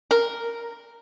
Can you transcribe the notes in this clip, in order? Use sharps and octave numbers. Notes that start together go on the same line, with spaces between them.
A#4